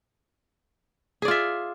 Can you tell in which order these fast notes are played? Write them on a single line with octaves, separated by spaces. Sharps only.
G#4 D5 F4 E5